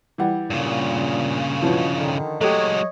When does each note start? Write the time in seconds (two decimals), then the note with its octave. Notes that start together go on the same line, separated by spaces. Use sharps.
0.18 E3 G3 F#5
0.50 G2 A#2 C#3
1.61 B2 E3 F3 C#4
1.95 D3 D#3
2.41 F#3 G#3 A3 G4 C#5 D#5